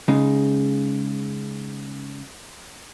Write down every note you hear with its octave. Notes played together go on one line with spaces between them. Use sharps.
C#3 G#3 D#4